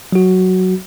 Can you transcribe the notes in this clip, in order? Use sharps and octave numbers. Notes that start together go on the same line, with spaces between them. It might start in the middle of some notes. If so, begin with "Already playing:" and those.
F#3 F#4